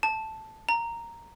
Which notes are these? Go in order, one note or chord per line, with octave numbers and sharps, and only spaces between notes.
A5
A#5